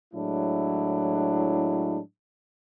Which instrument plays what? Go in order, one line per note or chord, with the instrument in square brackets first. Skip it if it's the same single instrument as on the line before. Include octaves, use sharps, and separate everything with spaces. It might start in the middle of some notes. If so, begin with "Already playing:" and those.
[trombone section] A2 F#3 G#3 D4 E4